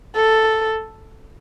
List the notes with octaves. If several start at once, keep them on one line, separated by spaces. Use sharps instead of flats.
A4